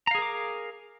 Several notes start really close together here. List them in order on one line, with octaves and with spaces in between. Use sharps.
A#5 F5 G#4 A#4 D6